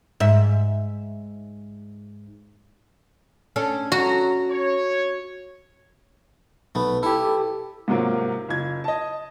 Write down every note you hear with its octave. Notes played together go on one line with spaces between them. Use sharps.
G#2 E5
C#4 D4 A4
F#3 F#4 A#5
C#5
B1 A3 B3
E4 G4 A4
G#2 C3 F#3 A#3 F4
F#1 F4 G#6
D#5 A5